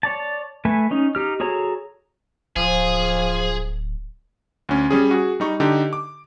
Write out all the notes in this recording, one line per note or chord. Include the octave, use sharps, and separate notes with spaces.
C#5 D5 A5
A3 B4 E5 G#5
C#4 D#4
D#4 G4 F6
F#4 G#4 A4 C#5 A#5
D1 F3 G#4
D2 C#4
G3 C#4 G#4
F#4 G#4
G3 D#4 C#6
D3 D#4 G4
D6